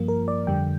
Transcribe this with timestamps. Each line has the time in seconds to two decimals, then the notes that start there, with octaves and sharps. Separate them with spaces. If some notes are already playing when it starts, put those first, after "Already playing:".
Already playing: G2 F3 A#3
0.08 A#4
0.28 D5
0.47 F2 D3 G3 G5